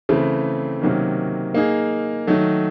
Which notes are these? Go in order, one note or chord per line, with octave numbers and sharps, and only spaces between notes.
C#3 E3 A3 C4
C3 D#3 F#3 A#3 C#4
A#3 D#4 G#4
D#3 F#3 A3